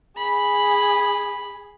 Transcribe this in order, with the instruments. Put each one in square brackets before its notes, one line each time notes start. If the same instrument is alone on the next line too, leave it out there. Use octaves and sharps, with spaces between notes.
[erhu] G#4 [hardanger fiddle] B5